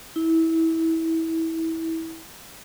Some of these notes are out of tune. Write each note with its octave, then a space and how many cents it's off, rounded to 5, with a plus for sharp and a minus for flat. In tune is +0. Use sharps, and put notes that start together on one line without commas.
E4 -20